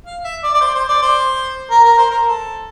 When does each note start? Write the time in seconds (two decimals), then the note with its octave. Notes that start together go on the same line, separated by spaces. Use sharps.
0.06 F5
0.24 E5
0.43 D5
0.54 D5
0.61 C5
0.74 C5
0.89 D5
1.02 C5
1.70 A#4
1.84 A#4
1.98 C5
2.11 A#4
2.26 A4